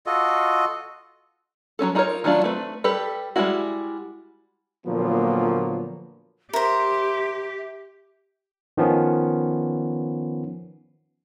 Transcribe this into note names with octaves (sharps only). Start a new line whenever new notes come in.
F4 F#4 A4 D#5
F#3 C4 C#4 A4
D4 D#4 F4 A#4 C#5
D#3 F#3 A3 D4 F4
A3 C4 B4
G3 G4 A4 B4
G3 G#3 A#3 E4 F#4
A#2 D3 F3 F#3 A#3 B3
G4 A#4 C5 E5
D#3 F3 B3 C#4